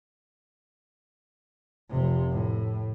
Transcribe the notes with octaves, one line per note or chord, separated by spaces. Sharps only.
F1 C3
A2